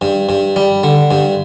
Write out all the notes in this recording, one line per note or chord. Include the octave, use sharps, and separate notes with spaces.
G2
G2
G3
D3
G2